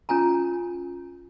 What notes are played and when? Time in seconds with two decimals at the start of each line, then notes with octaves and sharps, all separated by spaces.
0.09 C#4 F4 G#5 A#5